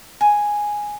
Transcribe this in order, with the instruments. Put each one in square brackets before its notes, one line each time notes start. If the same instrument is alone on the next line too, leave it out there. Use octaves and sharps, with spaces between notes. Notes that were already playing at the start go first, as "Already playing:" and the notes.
[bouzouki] G#5